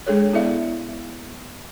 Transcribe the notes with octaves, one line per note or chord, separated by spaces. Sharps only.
G#3 D4 G#4 A4 C#5
B3 E4 A4 D5 E5 F5